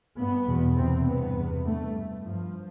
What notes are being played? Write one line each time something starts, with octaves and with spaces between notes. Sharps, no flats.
G2 B3
E2 B2
E2 C3 C4
G2 B3
E2 C3
G2 A3
G2
G2 F3